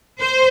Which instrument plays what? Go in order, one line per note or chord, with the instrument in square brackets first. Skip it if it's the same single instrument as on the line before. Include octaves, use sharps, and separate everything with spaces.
[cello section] C5